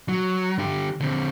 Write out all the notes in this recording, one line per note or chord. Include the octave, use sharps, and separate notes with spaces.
F#3
D3 G4
D3 C4